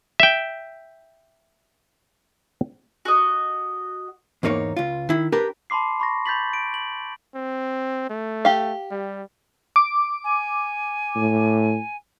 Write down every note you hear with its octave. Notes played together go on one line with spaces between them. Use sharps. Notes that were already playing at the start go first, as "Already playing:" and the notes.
E5 G5
F#4 D#5
E2 G#2 A#3 D#4 C#5
C#2 F4
D#3 E4
D4 G4 A#4 B4
A5 B5 C6 D6 C7
B5 C#6 A#6
B5 G6 A6 B6 F#7
D7
F#7
C4
A3
G4 F5
G3
D6
G#5
A2